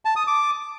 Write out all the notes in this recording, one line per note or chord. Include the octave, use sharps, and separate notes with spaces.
A5
D#6
D6